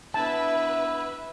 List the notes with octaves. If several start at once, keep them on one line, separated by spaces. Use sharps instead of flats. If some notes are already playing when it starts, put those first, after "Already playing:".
B3 D4 E4 B4 E5 A5